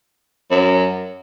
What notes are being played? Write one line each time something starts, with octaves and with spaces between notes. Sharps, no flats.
F#2